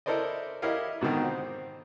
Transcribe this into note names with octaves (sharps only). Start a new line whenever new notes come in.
E4 A4 A#4 C5 D5 D#5
E4 G4 A#4 C#5 D#5 F5
G#2 B2 D3 D#3
C4